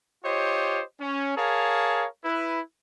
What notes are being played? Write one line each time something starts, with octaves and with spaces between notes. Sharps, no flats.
F4 G4 C5 C#5 D#5
C#4
G#4 A#4 C#5 F5 A5
E4 B4